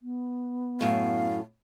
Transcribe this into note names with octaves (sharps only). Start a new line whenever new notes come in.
B3
F#2 A2 F5